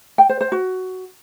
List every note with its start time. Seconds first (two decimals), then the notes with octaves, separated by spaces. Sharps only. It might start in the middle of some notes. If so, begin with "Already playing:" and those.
0.18 G5
0.29 C5
0.41 C5
0.52 F#4